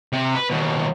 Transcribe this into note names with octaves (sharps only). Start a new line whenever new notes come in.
C3
B4
D#2 B2